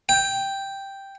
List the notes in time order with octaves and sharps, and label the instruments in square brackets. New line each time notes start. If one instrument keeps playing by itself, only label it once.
[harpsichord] G5